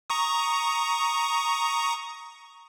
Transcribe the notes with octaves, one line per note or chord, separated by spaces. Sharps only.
A#5 C#6 D#6